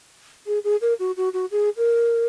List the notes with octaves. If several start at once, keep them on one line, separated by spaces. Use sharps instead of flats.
G#4
G#4
A#4
F#4
F#4
F#4
G#4
A#4